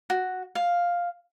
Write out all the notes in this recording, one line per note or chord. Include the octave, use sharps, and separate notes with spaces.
F#4
F5